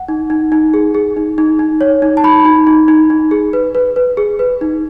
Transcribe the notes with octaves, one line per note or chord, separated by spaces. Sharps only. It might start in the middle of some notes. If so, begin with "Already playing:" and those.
Already playing: F#5
D#4
D#4
D#4
G#4
G#4
D#4
D#4
D#4
C#5
D#4
A5
D#4 B5
D#4
D#4
D#4
D#4
G#4
B4
B4
B4
G#4
B4
D#4